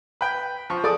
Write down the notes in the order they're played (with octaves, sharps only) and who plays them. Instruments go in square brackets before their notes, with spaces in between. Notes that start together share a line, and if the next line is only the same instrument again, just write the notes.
[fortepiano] B4 G5
F3 C#6
[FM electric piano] G#4 A4 A5 [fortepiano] D5 D6 D#6